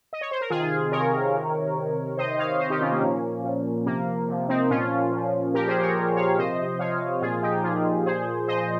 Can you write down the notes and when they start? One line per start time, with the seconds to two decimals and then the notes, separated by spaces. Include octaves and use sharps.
0.13 D#5
0.21 C#5
0.31 C5
0.41 A#4
0.50 C3 D#3 F4 G#4
0.92 C3 D#3 A#4 C#5
1.34 C3 D#3
1.76 C3 D#3
2.17 C3 D#3 C5 D#5
2.38 C#5 F5
2.60 C3 D#3 C5 D#5
2.70 D#4 G4
2.81 C#4 F4
2.92 A#3 C#4
3.02 A#2 F3
3.44 A#2 F3
3.86 C3 F3 A#3
4.29 C3 F3
4.49 C4 D#4
4.70 A#2 F3 C#4 F4
5.11 A#2 F3
5.54 A#2 F3 G4 A#4
5.67 G#4 C5
5.81 A#4 C#5
5.96 A#2 F3
6.16 C#5 F5
6.38 C3 F3 C5 D#5
6.79 C3 F3 C#5 F5
7.21 A#2 F3 F4 G#4
7.42 D#4 G4
7.64 A#2 F3 F4 G#4
8.06 A#2 F3 G#4 C5
8.47 A#2 F3 C5 D#5